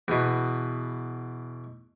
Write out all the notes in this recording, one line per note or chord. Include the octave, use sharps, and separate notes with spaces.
E2 B2